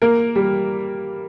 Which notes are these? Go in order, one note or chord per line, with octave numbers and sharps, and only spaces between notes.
A#3 A#4
G3